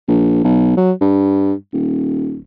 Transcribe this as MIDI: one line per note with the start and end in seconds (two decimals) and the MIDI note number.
0.08 0.43 34
0.44 0.76 35
0.77 0.92 54
1.01 1.53 43
1.73 2.41 27